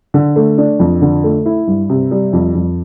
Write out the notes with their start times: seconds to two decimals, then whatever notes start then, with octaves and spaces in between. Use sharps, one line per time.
0.14 D3
0.36 A3
0.58 D4
0.80 F2
1.02 D3
1.24 A3
1.46 E4
1.67 G2
1.89 C3
2.11 G3
2.33 F2
2.55 F2